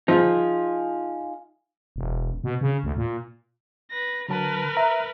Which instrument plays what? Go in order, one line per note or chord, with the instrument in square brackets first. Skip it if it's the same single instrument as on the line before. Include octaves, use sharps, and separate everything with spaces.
[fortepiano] F3 [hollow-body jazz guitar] D#4 F4 G#4
[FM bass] E1
B2
C#3
D2
A#2
[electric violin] B4 A#6
[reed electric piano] D3 F#3 A5 [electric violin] A#4 B4
[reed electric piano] E5 A#5